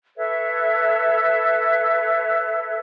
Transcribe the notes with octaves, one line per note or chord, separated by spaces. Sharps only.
A4 B4 C#5 E5